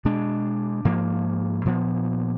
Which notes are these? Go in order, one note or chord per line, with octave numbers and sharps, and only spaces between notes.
B2 G#3 D4
G#2 F3 A#3
A#2 F3 B3